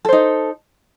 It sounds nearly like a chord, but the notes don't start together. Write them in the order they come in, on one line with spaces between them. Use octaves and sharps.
A4 C5 D#4